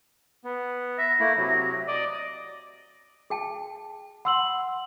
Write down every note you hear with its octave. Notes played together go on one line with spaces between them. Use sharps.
B3
E5 A#6
A3 A#3 E4
C3 F#3
D5 D#5 D6
G#4 G5 A5
F#5 B5 C6 E6 F#7